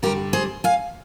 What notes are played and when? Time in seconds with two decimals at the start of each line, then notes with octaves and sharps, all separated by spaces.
0.02 G2 D3 G3 G4 A#4
0.33 G#4 C5
0.64 F5 G#5